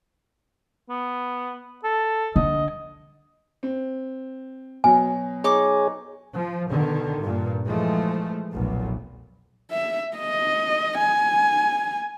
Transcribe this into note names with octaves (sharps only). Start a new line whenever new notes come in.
B3
A4
D3 D#5
C4
B2 F#3 G#5
D#4 G#4 C#5 D6
F3
B2 D3 D#3
G2 A#2
E3 F3 G#3 A3
F1 B1 A#2
E5
D#5
G#5